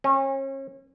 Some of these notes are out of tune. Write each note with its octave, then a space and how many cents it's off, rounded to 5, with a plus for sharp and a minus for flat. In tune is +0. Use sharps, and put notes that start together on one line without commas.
C#4 -35